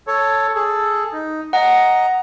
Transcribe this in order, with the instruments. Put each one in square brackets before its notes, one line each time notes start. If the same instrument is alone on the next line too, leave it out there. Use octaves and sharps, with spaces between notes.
[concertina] A4 C#5
G#4 A4
D#4
[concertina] D#5 A#5 [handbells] F#5